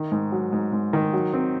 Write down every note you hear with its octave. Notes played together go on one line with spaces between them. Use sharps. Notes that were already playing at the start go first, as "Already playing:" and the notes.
Already playing: D#3
G#2
F#3
G#2
G#2
D#3
F#3
C4